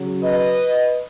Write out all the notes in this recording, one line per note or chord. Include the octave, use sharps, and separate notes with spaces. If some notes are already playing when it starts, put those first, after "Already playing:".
Already playing: C#3 F#3
B4 D#5